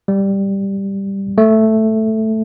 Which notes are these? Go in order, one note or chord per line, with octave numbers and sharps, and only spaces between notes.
G3
A3